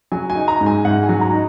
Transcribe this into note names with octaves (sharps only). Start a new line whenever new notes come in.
F#3 G#5
G#5
D#4
A#5
G#2
G#5
G#2 F#5
G#5
F#3
A#5
D#4